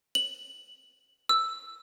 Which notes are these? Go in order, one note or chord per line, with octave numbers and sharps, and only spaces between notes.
F#7
E6